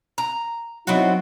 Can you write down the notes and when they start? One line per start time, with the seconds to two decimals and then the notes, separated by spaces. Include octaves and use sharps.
0.18 A#5
0.87 F#3 B3 C4 D#4 E4 F#4